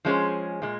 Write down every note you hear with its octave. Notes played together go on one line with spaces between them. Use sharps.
F3 G#3 C#4 G#4 C5
A#2 G#3